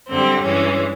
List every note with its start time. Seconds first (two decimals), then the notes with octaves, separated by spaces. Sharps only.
0.09 F#2 D3 G3 C4
0.43 G2 E3 G#3 C#4